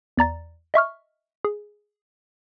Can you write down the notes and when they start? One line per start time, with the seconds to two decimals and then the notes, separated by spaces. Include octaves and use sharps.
0.17 E2 D5 A#5 A6
0.74 D#5 E5 C#6 F6
1.45 G#4